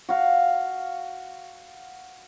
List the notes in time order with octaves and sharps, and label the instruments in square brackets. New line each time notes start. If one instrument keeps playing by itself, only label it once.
[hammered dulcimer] F#4 F5